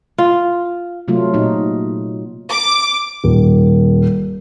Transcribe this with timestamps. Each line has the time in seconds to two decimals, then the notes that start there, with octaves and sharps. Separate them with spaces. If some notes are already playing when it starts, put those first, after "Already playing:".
0.18 F4
1.08 C3 F#3 A3 F4
1.34 A#2 D#4 F#4
2.51 D6
3.24 D#1